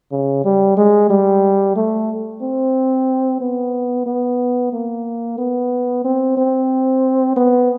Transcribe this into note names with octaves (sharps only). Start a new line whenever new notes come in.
C#3
G3
G#3
G3
A3
C4
B3
B3
A#3
B3
C4
C4
B3